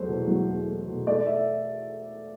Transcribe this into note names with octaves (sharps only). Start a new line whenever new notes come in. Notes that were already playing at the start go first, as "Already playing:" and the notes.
Already playing: E2 F#3 A3 C5
B2
F#3
E2
A3
B2
A3 D5
E5